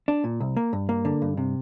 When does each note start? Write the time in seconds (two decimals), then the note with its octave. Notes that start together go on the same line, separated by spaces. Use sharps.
0.08 D4
0.24 A#2
0.40 C2
0.57 A#3
0.73 G2
0.89 A#3
1.05 D3
1.22 G2
1.37 C3